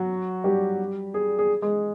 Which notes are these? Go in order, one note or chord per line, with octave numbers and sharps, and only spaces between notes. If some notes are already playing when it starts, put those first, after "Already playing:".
Already playing: F#3 F#4
G3 G4
G#4
G#4
G#3 G#4